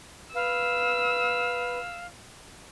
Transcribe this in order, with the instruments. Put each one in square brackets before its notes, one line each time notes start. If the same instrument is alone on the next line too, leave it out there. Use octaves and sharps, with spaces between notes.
[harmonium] B4 [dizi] F5 [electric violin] E6